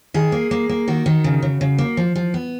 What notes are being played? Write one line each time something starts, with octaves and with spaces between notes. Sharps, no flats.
D#3 G#4
A#3
A#3
A#3
D#3 F#4
D#3
C#3
C#3
C#3
A#3
F3
F3
B3